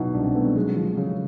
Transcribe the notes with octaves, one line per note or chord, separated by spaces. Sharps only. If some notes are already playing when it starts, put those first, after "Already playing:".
Already playing: B2 F#3 D#4 E4
C2 D4
C4
A3 B3
G3
F#3 G#3
F3
C#3